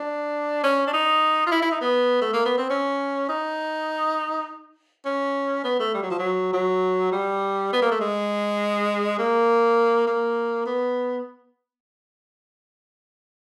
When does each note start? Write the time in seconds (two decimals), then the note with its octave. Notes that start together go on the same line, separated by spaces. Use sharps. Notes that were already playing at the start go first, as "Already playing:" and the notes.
Already playing: D4
0.63 C#4
0.87 D4
0.93 D#4
1.46 F4
1.52 E4
1.62 E4
1.71 D#4
1.81 B3
2.21 A3
2.33 A#3
2.45 B3
2.58 C4
2.70 C#4
3.29 D#4
5.06 C#4
5.64 B3
5.80 A3
5.94 G3
6.02 F#3
6.10 F3
6.18 F#3
6.53 F#3
7.12 G3
7.73 B3
7.82 A#3
7.91 A3
8.00 G#3
9.19 A#3
10.07 A#3
10.66 B3